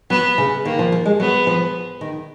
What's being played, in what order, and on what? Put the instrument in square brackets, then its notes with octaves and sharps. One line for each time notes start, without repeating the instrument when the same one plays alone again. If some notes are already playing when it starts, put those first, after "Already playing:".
[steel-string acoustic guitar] F#3 [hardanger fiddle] B3
[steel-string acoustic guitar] C#3
[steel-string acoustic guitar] D#3 [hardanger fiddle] A#3
[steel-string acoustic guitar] F3
F3
G#3
[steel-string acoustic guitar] F#3 [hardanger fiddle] B3
[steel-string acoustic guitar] F3
D#3